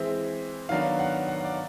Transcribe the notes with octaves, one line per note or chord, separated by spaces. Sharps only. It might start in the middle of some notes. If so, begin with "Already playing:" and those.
Already playing: E3 G#3 C4 E5
D#3 F#3 B3 D4 F5
F#5
F#5
D5